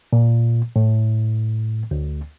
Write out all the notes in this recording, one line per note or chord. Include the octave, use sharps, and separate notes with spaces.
A#2
A2
D2